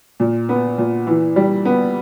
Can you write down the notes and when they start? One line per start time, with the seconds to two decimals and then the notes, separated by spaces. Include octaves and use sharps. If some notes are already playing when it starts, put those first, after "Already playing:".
0.20 A#2
0.49 B3
0.78 A#2
1.07 E3
1.36 G3
1.65 B3